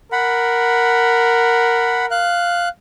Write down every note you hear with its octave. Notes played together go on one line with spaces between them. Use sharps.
A#4 F#5 B5
F5 F#6